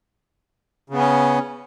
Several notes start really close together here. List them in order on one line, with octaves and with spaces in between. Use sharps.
C#3 B3 C#4